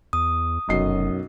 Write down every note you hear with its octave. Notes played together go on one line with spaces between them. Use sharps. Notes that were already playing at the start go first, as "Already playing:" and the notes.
E2 D#6
F1 B1 F#2 D#5 C7